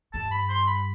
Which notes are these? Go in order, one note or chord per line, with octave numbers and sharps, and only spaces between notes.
G2 A5
B5
C6
B5